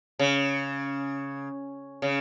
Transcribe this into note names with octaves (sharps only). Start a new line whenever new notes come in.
C#3
C#3